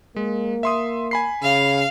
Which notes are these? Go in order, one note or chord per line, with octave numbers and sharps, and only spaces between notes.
G#3 A#3
E5 C6 D#6
G#5 B5 C7
C#3 F5